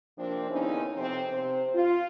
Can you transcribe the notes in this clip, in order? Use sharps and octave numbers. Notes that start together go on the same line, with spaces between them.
C3 F3 A#3 C4 D4
D#2 C#3 B3 C#4 D#4 E4
F2 C3 C4
C3 C5
F4